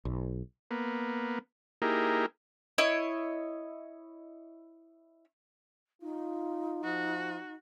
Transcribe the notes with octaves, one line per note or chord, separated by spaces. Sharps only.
B1
A#3 B3
A#3 D#4 E4 G4 G#4 A#4
E4 C#5 D#5
D#4 F4
F3 F#4